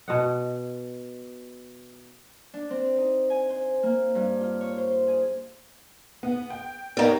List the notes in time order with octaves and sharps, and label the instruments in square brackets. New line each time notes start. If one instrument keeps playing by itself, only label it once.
[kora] B2 D#5 F#5
[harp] D4
C4
D#4
G#5
C5
A#3
G2
F4
C#5
C5
G#4
[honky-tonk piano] B3
G5
[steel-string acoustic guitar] G3 A#3 [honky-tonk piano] B3 D#4 C#5